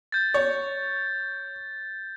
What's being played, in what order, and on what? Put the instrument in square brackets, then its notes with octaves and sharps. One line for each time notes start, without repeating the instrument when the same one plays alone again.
[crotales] G6 A6
[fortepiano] C#5